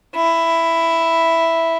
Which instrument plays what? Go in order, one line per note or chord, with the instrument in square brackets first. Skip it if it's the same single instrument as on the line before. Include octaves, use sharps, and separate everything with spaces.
[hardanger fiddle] E4